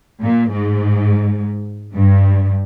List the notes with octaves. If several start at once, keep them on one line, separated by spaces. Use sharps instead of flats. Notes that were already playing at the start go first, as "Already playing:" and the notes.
A#2
G#2
G2